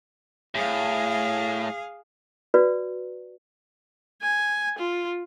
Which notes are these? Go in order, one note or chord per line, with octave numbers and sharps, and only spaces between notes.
A2 G#4 F5
F#4 B4 D5
G#5
F4